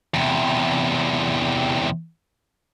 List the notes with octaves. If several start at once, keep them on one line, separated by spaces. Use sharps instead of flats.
E2 C3